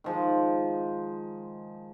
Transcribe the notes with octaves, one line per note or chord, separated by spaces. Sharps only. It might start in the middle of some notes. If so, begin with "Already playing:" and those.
D#3 F3 G#3